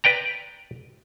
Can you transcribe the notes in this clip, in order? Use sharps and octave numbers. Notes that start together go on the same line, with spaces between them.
B4 D5 G5 A#5